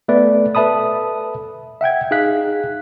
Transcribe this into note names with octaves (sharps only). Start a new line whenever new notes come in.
A3 B3 B4 D5
A4 B4 E5 A5 B5 D#6
E5 F#5 G5 G#6
D#4 G#4 F5 F#6 B6